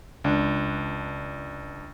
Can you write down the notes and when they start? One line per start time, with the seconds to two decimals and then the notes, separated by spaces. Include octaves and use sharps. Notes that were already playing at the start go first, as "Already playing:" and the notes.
0.24 C#2 D4